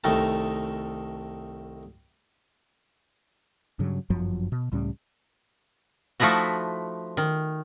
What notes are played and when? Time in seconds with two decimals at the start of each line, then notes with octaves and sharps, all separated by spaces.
0.04 C2 D#3 A3 A#4 A5
3.79 G2 C#3 F#3
4.10 G1 F#2 F3 F#3
4.52 B2
4.72 C#2 A2 G3 C#4
6.20 F3 A3 D#4 E4 F#4
7.17 D#3